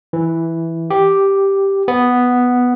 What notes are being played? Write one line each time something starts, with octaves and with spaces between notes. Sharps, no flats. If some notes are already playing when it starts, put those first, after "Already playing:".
E3
G4
B3